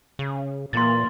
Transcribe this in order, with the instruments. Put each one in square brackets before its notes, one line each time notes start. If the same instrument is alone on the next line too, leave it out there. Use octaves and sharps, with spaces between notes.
[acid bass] C#3
[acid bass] A#2 [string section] E3 A#3 [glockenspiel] C6 A6